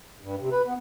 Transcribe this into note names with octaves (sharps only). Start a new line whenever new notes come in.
G2
C3
B4
B3